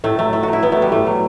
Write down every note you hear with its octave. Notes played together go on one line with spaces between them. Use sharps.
A2 A3
F#3 A3
A2 A3
F#3 F#4
E4
A2 B3
F#3 A3
G3
A2 A3
F#3